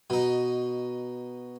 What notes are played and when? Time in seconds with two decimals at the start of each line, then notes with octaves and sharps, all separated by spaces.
0.10 B2 D#4